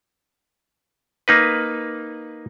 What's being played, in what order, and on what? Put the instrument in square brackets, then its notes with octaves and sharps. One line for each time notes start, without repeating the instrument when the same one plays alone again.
[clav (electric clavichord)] A#3 D#4 B4